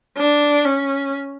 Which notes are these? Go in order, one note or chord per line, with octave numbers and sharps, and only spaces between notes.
D4
C#4